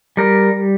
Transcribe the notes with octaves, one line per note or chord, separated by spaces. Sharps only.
G3 A#4